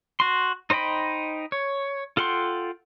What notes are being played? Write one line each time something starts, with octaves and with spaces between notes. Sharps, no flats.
F#4 C6
D#4 C5 D#5 G5 B5
C#5
F4 A4 F#5 G5 C6